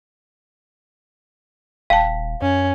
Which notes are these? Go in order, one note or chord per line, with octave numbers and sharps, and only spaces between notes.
D#1 F5 G5 A5
F#2 C#4